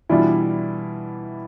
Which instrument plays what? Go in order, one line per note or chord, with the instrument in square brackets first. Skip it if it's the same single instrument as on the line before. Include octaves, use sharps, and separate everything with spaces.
[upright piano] B2 G3 D4 F4 [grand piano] E3 E4